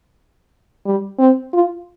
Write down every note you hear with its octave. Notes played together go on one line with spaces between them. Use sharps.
G3
C4
F4